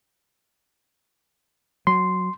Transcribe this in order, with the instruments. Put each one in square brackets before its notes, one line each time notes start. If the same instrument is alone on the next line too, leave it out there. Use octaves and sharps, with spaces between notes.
[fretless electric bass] F#3 [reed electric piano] C6